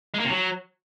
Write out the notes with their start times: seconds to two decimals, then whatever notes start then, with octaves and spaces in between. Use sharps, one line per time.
0.14 G#3
0.19 A#3
0.25 C3
0.30 F#3